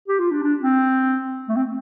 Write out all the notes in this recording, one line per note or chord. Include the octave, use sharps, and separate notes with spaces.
G4
F4
D4
D4
C4
A3
C4